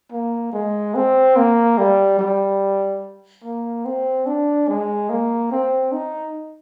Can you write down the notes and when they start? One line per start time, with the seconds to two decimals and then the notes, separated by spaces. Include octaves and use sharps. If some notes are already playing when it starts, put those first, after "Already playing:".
0.12 A#3
0.53 G#3
0.95 C4
1.36 A#3
1.78 G3
2.19 G3
3.44 A#3
3.85 C4
4.26 D4
4.69 G#3
5.10 A#3
5.52 C4
5.92 D#4